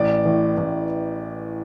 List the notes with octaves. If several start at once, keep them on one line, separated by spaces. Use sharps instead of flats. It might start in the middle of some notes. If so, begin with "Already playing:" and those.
Already playing: A1 D5
A2 E3
A1